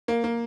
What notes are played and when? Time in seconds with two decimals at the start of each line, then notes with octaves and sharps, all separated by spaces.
0.08 A#3
0.24 A#3